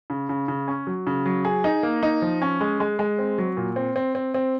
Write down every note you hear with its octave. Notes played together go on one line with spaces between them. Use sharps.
C#3
C#3
C#3
C#4
F#3
C#3
F#3
G#4
D#4
A#3
D#4
F3
C#4
G#3
G#3
G#3
C4
F#3
A#2
C4
C4
C4
C4